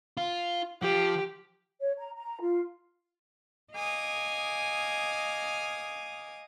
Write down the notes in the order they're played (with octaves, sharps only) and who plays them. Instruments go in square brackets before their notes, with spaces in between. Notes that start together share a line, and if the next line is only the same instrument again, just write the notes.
[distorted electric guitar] F4
[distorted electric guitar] F3 [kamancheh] G4
[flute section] C#5
A#5
A#5
F4
[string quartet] D#5 F5 G#5 D6 D#6